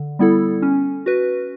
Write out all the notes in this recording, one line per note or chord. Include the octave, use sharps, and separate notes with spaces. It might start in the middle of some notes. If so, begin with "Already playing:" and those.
Already playing: D3
G3 B3 E4 A4
C#4
F#4 B4